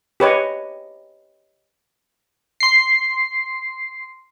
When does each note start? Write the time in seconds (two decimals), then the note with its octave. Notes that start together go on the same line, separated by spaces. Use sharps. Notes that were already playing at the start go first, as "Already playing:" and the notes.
0.20 G4 B4 C#5 D#5
2.60 C6 C7